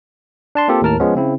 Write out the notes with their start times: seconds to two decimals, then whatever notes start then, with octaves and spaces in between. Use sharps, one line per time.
0.55 D4 A5 C6
0.68 A#3 C4 F4 G4 A4
0.82 D#2 A2 A#4 A5 F6
1.00 F3 G#3 B3 C#4
1.15 C#3 C4 E4